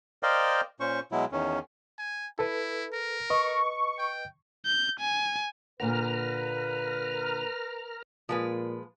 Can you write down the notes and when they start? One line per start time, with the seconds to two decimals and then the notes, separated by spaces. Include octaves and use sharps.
0.23 A#4 C5 D5 D#5 F5 G5
0.80 A#2 C#4 C5 C#6
1.12 B2 F#3 G#3 E4
1.32 E2 D#3 C#4
1.99 G#5
2.39 E4 A4 B4
2.93 A#4
3.30 B4 D#5 C#6
3.99 G5
4.66 G6
5.00 G#5
5.80 A#2 D3 A#4 B4 F#5 A#5 F6
8.29 A#2 F3 G#3 B4